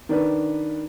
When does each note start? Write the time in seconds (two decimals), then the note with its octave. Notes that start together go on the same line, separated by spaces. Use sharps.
0.09 D#3 D4 B4